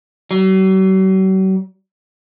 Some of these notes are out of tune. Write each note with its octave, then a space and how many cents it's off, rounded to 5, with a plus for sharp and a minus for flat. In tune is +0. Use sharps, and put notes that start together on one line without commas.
F#3 +45